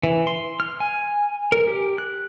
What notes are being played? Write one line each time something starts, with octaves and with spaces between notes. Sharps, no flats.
E3
C6
F6
G#5
A#4
G4
F#6